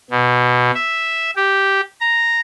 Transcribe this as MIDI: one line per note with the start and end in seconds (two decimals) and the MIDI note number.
0.10 0.71 47
0.74 1.31 76
1.36 1.81 67
2.00 2.40 82